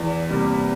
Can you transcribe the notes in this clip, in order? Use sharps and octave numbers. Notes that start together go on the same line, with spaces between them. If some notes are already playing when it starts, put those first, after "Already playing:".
Already playing: E2 D5
C3 G3 A#3